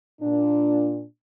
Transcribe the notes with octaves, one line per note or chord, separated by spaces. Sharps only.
A#2 D4